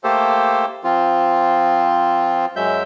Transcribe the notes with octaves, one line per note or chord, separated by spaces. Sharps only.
A3 A#3 G4 A4 C5
F3 C4 F4
F#2 F#3 G#3 E5 G6